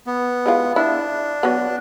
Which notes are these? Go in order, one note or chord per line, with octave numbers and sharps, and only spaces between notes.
B3
G#3 E4 F4
D4 E4
F#3 B3